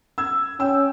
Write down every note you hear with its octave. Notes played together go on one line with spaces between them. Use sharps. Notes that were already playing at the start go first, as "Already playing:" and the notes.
E6 G#6
C#4 G5 E6